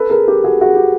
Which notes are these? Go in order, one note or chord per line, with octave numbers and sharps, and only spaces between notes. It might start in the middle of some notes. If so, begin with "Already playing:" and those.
Already playing: A4 B4
G#4 A#4
G4 A4
F#4 G#4
F#4 G#4
G4